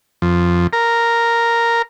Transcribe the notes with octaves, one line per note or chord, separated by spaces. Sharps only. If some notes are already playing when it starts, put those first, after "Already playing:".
F2
A#4